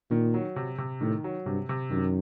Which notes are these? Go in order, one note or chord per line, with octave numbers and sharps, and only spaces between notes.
A#2 D#3
F#3
C3
C3
A2 D#3
F#3
G2 C3
C3
F#2 D#3